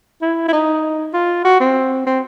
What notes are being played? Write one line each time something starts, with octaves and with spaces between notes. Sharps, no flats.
E4
E4
D#4
F4
F#4
C4
C4